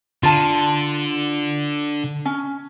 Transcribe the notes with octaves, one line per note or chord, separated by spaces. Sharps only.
D3 F4 A5
C#4